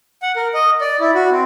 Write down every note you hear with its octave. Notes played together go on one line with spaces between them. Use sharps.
F#5
A#4
D#5
D5
E4
F#4
C4